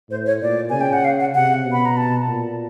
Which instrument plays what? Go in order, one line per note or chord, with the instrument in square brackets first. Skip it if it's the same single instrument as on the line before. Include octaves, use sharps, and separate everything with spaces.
[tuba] A2 [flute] C5
[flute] C#5
[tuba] A#2 [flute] D5
[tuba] C#3 [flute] G#5
[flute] G5
F#5
F5
F#5
[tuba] C3 [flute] F#5
[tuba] B2
[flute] B5
A#5
A5
[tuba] A#2